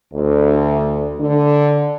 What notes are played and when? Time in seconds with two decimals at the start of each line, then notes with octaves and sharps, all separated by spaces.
0.13 D2
1.19 D3